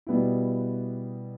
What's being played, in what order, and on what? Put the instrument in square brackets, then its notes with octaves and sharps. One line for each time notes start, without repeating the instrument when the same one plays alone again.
[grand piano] B2 G3 B3 E4